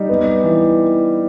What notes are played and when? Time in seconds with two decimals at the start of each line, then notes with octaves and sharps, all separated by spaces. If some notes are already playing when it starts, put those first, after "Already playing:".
Already playing: G3 D#4
0.09 B3
0.43 E3